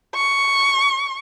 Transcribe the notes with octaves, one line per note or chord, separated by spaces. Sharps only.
C#6